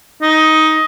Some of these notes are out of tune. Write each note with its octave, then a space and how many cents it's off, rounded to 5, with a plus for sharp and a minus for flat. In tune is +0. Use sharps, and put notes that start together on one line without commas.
D#4 +10